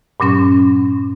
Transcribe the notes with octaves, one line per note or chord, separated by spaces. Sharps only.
G2 A#2 F#3 C#4 C6